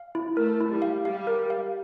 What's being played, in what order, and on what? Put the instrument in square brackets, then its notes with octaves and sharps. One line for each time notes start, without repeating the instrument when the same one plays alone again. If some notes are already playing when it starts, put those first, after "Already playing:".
Already playing: [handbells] F5
E4
[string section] A3 [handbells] A#4
[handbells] E4
[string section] G3
[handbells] F5
[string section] G3 [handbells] F5
[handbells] A#4
F5